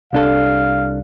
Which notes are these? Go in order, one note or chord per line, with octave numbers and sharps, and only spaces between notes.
C2 D4 A4 F5